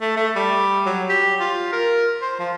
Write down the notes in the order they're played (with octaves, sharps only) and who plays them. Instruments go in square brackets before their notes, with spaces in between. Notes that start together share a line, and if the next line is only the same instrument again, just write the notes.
[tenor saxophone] A3
A3
G3
F#3
G4
F4
A#4
C5
F3